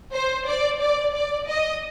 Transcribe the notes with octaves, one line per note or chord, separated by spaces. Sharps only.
C5
D5
D5
D5
D#5